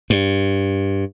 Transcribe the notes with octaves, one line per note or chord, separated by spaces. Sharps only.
G2